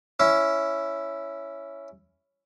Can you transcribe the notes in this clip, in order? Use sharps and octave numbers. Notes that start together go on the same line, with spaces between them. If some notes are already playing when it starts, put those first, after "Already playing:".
C#4 E4